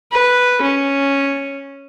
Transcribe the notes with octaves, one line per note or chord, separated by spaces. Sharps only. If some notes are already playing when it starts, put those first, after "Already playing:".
B4
C#4